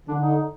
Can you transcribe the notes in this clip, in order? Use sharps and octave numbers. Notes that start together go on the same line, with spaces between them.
D3 D4
D#4